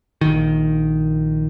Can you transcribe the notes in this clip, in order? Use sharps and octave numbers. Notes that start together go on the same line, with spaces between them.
A#1 D#3